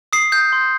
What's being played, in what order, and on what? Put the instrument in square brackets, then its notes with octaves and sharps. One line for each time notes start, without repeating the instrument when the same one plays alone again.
[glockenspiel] D#6 C7
G6
C6